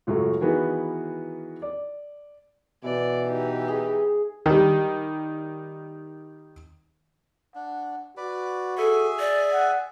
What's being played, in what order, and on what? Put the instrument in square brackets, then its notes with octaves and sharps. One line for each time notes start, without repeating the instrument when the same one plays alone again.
[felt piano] C#2 F#2 F#3 A3
D#3 E3 B3 F#4 G#4 A#4
D5
[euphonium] B2 [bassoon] E3 [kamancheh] D5
[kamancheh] D#4 G4
[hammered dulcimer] G#4
[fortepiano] D#3 G3
[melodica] D4 [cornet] F#5
[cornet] F#4 [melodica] B4 D5
[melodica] G#4 E5 G#5 [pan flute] A4
[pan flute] D5
[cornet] F#5